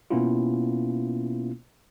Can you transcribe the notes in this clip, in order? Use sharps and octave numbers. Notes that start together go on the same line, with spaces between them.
B2 A#3 B3 C#4 E4 F4